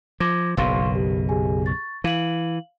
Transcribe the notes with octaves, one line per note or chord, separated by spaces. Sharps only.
F3 D6 G#6 A#6
F#1 B1 B2 F5 C6 C#6
G4
G4 G#4 G#5
C#6 A6
E3 F5 F#7